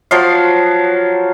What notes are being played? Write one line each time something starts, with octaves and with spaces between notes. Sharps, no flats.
F3 F#3 F5